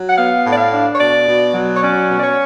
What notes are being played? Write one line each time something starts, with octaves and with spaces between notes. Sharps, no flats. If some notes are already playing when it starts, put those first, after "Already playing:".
Already playing: F#3
F#5
B3 F5
A2
D5
F5
D4
C#5
B2 D5
B2
F#3
C#5
C#4 D5
B2
D5
C#5